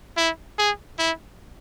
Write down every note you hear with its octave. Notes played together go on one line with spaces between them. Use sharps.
E4
G#4
E4